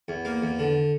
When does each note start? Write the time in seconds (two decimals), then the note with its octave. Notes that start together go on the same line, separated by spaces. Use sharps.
0.08 E2
0.25 A#3
0.42 E2
0.59 D3